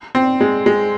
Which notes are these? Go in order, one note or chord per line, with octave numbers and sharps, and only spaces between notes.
C4
G#3
G#3